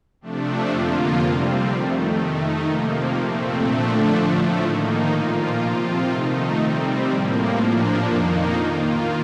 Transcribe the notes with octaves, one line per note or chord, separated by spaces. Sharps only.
C3 F3 A3 D4
F2 D3 F3 A#3 F4
C3 G3 C4
F2 D#3 A3
D#3 A3 D#4
C3 F3 A#3
A#2 A3 C4
D3 F3 A3 D4
A2 F3 A3
D#3 A#3 D#4
A#2 F3 A#3 F4
C3 F3 C4 F4
D#3 A3 D#4
C3 G3 C4
A2 F3 A#3
A#2 F3 A#3 D4
F2 D#3 A#3 D#4
D#3 A#3 F4